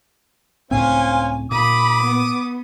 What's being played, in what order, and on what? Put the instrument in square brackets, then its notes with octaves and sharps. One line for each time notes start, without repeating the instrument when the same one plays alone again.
[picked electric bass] C#2 A2 C4 [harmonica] C#4 C5 F5 [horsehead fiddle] G#5
[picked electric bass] A#2 [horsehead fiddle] B5 [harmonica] D6 D#6
[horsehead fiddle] B3